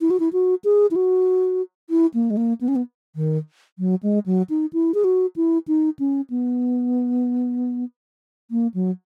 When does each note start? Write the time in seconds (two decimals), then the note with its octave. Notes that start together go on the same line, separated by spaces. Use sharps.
0.01 E4
0.10 F#4
0.20 E4
0.33 F#4
0.64 G#4
0.91 E4
0.96 F#4
1.90 E4
2.14 A#3
2.30 G#3
2.37 A#3
2.61 B3
2.68 C#4
2.76 B3
3.16 D#3
3.79 F#3
4.03 G#3
4.26 F#3
4.49 D#4
4.73 E4
4.94 G#4
5.04 F#4
5.36 E4
5.68 D#4
5.99 C#4
6.30 B3
8.51 A#3
8.74 F#3